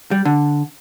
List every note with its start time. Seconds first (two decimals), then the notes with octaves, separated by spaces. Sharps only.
0.11 G3
0.25 D3